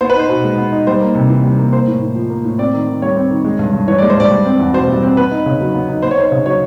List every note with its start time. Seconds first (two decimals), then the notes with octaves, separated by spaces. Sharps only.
0.01 B3 C5
0.10 B4
0.15 D#4 C5
0.29 B2
0.44 G#3
0.58 B3
0.72 D#4
0.87 G3 C5
1.01 A#3
1.15 C3
1.30 E3
1.44 G3
1.58 A#3
1.73 A#3 C5
1.87 A2
2.01 A2
2.15 F3
2.30 A#3
2.44 A2
2.58 C4 D5
2.73 D#3
2.88 D#3
3.02 G3 C#5
3.16 C4
3.30 D#3
3.45 G#3
3.59 G2
3.73 G2
3.88 E3 C#5
3.98 D5
4.02 G#3
4.10 C5
4.17 G2 D5
4.31 G3
4.46 C4
4.59 E2
4.73 B2 C5
4.88 G3
5.03 C4
5.17 B3 B4
5.31 D#4
5.46 C#3
5.61 F#3
5.74 B3
5.89 D#4
6.03 B3 C5
6.11 C#5
6.18 D#4 C5
6.32 C#3
6.46 F#3 C#5